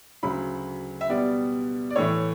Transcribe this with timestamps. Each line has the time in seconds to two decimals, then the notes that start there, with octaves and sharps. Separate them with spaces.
0.23 D2 C#3 F#3 B5
1.01 E5
1.09 B2 G3 B3 D5
1.90 D5
1.96 A2 E3 A3 C#5